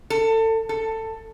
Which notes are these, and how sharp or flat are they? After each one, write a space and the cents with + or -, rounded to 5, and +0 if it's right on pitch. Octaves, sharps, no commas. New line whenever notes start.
A4 +25
A4 +15